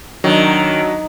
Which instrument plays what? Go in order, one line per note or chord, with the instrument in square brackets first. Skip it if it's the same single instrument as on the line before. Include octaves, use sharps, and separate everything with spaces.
[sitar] D#3 [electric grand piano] F#3 D4